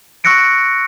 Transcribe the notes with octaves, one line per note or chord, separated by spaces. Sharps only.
C#6 E6 F#6 A#6 C#7 D7